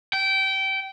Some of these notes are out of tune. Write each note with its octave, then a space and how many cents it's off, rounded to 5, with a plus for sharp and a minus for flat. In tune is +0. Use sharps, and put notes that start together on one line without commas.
G5 -20